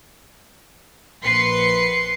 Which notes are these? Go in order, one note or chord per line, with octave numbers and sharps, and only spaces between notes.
A#1 B4 C6 C7 C#7